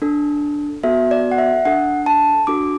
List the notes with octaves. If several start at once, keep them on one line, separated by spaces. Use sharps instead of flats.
D4 A4
B3 F#4 A4 E5
D5
F#5
E5
D4 A4 F#5
A5
D4 F#4 A4 D6